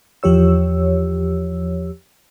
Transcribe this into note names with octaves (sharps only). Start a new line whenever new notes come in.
E2 F3 G4 C#5 E6